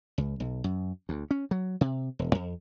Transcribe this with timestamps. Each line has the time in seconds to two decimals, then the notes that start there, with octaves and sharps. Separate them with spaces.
0.18 C#2
0.40 B1
0.64 F#2
1.09 D2
1.31 C#4
1.51 F#3
1.81 C3
2.19 E1
2.35 F2